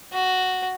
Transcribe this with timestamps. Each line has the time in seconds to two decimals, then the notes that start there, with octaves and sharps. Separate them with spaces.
0.13 F#4